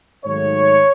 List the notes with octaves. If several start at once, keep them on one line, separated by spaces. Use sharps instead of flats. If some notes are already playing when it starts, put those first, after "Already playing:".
G#2 D#3 F#3 A3 C#5